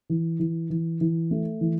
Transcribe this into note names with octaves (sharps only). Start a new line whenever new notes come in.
E3
E3
E3
E3
A3
E3